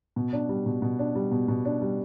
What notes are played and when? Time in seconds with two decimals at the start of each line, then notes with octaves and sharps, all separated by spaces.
0.16 B2
0.33 D4
0.49 G3
0.66 B2
0.82 B2
0.99 D4
1.15 G3
1.32 B2
1.48 B2
1.65 D4
1.82 G3